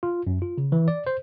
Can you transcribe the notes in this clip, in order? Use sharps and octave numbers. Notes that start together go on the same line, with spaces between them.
F4
F#2
F4
C#3
E3
D5
C5